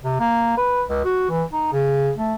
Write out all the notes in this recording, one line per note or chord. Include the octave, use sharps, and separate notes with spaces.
C3
A#3
B4
C#2
F#4
E3
D#4
C#3
A3